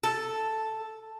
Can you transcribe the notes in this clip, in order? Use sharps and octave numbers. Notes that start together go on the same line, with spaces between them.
A4